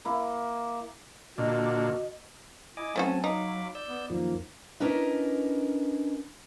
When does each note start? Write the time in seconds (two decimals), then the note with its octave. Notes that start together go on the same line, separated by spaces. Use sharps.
0.05 A#3 E4
1.38 A#2 D3 F#4 D#5
2.77 E4 D#5 G#5 D6
2.96 F#3 A3 C4 C#4 F#4 G#5 A5
3.24 D#4 F5 B5 D6
3.75 D5 E6 G6
3.88 B3
4.10 F#2 D#3 F3 A#3
4.80 C#4 D4 E4 A#4 B4 D#5